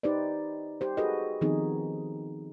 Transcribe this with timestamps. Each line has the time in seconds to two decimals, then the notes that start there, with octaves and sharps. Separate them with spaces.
0.03 D#4 G4 B4 C5 D5
0.81 G4 C5
0.97 F#4 G#4 A4 B4 D#5
1.41 D#3 F3 B3 C4 D#4 G#4